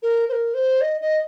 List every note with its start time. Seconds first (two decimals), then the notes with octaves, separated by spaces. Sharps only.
0.03 A#4
0.29 C5
0.32 A#4
0.54 C5
0.81 D#5
1.01 D#5